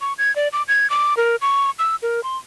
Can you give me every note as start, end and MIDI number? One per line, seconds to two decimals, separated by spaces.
0.01 0.13 85
0.18 0.34 92
0.36 0.48 74
0.53 0.63 86
0.68 0.90 92
0.90 1.14 86
1.17 1.36 70
1.42 1.71 85
1.79 1.96 88
2.02 2.23 70
2.24 2.37 84